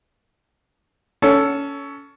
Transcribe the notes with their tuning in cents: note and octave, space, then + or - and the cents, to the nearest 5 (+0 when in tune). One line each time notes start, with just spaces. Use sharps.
C#4 +20 A4 +0